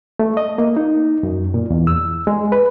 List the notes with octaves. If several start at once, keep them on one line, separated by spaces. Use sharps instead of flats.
A3
D#5
A#3
D#4
F#2
A#2
E2
E6
G#3
B4